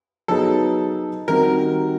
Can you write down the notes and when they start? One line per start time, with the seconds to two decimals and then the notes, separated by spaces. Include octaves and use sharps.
0.28 F#3 B3 D#4 G#4 A4 B4
1.28 D#3 G3 C4 D#4 F#4 A#4